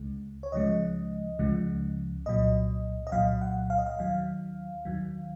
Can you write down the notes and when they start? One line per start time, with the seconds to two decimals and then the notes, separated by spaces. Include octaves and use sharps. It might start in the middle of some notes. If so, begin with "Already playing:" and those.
Already playing: C#2 C#3 G#3
0.43 C#5
0.52 C#2 C#3 F3 G#3 D#5
1.39 C#2 C#3 F3 G#3
2.26 C2 A#2 F#3 D#5
3.07 D#5
3.12 C2 A#2 F#3 F5
3.41 F#5
3.70 F5
3.78 D#5
3.86 F5
3.99 D#2 D#3 F#3 F5
4.85 D#2 D#3 F#3